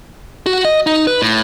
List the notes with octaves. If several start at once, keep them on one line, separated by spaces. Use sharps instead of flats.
F#4
D#5
D#4
B4
A2